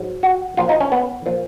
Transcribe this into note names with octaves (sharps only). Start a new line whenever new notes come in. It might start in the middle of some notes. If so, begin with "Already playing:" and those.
Already playing: G#2 F#3
F#4
A#2 F3 F4
D#4
C#4
B3
A#2 F3